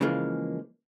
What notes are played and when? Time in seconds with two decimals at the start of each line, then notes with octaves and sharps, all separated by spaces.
0.01 C#3 E3 F3 G#3 A#3